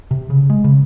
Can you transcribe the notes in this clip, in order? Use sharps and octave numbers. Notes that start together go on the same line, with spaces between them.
C3
C#3
G#3
C#3